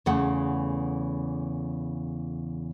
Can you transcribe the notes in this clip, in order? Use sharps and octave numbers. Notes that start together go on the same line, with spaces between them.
E2 C#3 E3 A3 F#5